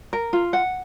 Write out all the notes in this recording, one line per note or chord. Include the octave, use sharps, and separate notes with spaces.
A#4
F4
F#5